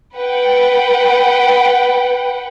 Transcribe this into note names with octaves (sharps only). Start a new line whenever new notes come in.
B4 F#5 G5